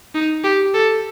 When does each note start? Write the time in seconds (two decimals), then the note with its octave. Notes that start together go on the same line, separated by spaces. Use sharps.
0.15 D#4
0.44 G4
0.74 A4